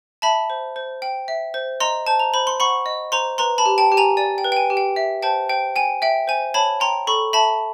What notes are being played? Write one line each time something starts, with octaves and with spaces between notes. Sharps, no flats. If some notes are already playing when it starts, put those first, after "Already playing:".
E5 A5 B5
C5
C5
G5
E5
C5
D#5 A#5 C6
C5 A5
A#5
C5 B5
C6
F#5 B5 C#6
D#5
C5 A#5 C6
B4 A#5 C6
A5 B5
G4
G5 A5
G4
G#5 A#5
D5 G#5
G5
B4
G5
G#5
G4
G5
E5
C5 G5 A5
C5 G5
G5 G#5
E5 G5
C5 G#5
C#5 A5 B5
G5 A#5 C6
A4 B5 C#6
E5 A5 B5